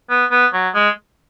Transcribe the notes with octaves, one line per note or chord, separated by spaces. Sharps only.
B3
B3
F#3
G#3